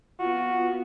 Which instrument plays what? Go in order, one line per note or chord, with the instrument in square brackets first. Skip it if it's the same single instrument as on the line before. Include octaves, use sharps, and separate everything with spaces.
[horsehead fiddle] B3 F4 [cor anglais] F#4